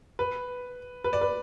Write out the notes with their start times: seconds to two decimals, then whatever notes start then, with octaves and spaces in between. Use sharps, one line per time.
0.19 B4
1.04 B4
1.13 D5
1.21 B4